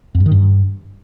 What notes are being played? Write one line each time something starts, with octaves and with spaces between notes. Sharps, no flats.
F2
G2
D#3
G2